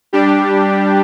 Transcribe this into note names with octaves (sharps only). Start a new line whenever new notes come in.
G3 D4 G4